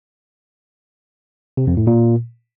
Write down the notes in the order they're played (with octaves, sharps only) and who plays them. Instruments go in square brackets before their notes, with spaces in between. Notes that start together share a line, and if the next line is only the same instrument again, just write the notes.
[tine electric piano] C3
F2
A2
A#2